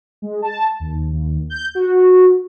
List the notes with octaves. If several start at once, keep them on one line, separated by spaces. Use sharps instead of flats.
G#3
A5
D#2
D#2
G6
F#4